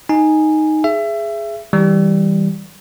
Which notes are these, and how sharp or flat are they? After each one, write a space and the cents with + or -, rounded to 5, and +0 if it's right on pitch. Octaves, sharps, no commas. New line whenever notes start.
D#4 +0 G#5 +0
G#4 +5 E5 +25
E3 -25 G3 +0